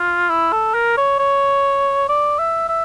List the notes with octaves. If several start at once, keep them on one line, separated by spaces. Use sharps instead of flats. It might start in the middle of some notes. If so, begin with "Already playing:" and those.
Already playing: F4
E4
A4
A#4
C#5
C#5
D5
E5
E5